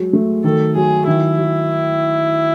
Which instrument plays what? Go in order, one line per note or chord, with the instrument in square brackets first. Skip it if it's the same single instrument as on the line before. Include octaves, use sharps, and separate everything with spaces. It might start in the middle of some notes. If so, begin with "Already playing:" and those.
Already playing: [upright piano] F#3 G#3
A3
[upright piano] D#3 [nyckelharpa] A4
[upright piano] F#3 [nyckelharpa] G#4
[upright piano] D#3 [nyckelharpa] E4
[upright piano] F#3